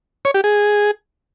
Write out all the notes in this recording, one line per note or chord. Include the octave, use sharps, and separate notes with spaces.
C#5
G4
G#4